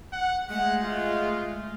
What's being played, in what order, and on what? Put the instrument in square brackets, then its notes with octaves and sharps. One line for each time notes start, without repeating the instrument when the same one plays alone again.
[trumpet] F#5
[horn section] G#3 [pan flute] A3 [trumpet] F#5
[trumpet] F4